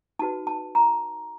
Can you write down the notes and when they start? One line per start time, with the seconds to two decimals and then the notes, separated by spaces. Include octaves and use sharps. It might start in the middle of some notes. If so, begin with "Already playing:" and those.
0.19 D#4 F#4 B4 A5
0.47 A5
0.75 A#5